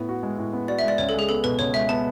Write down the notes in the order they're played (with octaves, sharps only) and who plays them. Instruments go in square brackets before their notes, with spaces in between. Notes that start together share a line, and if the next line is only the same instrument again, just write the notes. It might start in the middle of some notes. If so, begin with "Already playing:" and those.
Already playing: [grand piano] A2 B3
F#4
G#3
A2
B3
[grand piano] F#4 [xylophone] D5
[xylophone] E5
[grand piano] G#3 [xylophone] D5
[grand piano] C#2 [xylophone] C#5
[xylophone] A4
[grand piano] G#3 [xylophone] G#4
[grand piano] B3 [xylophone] A4
[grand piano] B2 [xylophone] B4
[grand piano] C#2 [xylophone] C#5
[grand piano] G#3 [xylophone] E5
[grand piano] B3 [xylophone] A5